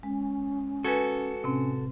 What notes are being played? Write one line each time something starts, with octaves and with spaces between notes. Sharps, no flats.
G#3 C#4
F#4 A4 B4 G#5 G#6
A2 C3 C4 C#4